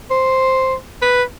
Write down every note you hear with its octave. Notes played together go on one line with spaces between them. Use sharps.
C5
B4